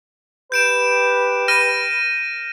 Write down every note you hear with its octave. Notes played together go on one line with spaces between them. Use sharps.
G4 B4 G6 D7 E7
F6 A#6 D#7